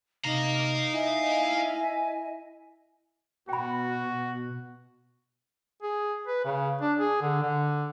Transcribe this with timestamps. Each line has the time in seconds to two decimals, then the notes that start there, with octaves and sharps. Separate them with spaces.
0.25 C3 D#4 F5 A#5
0.93 E4 D#5 E5 G#5
3.49 B2 F#4 G5 B5
5.82 G#4
6.27 B4
6.45 C#3
6.82 D4
6.99 G#4
7.22 D3
7.42 D3